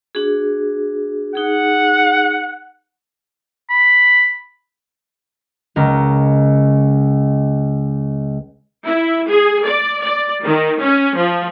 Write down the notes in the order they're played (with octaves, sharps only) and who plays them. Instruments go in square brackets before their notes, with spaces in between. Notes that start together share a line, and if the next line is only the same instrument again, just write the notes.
[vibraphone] D4 F#4 G#4
[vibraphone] D#4 G#4 [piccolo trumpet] F#5
[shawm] B5
[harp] C#2 A#4
[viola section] E4
G#4
D5
D5
D#3
C#4
F3